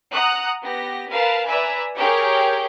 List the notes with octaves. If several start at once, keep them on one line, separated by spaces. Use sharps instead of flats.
F#5 A#5 D#6 F#6
B3 G4 A#6
A#4 B4 F5 A5
B4 D5 E5 G#5 A#5
G4 G#4 A#4 C#5 G5